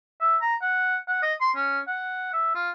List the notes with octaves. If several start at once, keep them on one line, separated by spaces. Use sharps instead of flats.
E5
A#5
F#5
F#5
D#5
C6
C#4
F#5
E5
F4